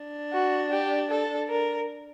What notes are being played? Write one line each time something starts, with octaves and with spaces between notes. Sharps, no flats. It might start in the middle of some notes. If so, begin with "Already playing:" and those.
Already playing: D4
F#4
G4
A4
A#4